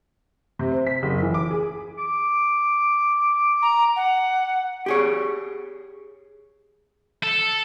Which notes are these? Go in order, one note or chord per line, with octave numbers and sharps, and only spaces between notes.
C3
C5
B6
F#1
E3
D6
G#4
D6
A#5
F#5
G4 G#4 C#5
A4